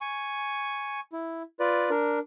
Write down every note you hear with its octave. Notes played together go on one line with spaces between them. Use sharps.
G#5 C#6
E4
F4 B4 D5
D4 A#4